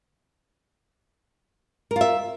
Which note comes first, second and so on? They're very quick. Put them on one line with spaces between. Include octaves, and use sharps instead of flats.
A#4 F4 E5